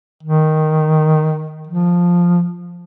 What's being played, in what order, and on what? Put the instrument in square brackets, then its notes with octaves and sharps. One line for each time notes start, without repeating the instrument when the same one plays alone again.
[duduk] D#3
F3